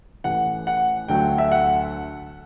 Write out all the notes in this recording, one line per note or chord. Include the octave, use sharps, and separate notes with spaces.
A1 A2 E3 F#5
F#5
D2 D3 F#3 A3 G5
E5
F#5